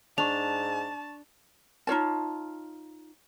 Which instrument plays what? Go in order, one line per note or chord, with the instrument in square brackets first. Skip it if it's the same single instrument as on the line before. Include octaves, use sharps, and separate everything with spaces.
[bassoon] G#2 [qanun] D4 [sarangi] A5 [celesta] C#6 F7
[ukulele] D#4 F4 C#5 A5